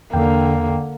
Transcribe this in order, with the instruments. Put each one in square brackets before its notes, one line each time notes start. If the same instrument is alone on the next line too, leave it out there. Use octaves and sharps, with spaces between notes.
[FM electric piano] E2 G5 [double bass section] D3 [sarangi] A#3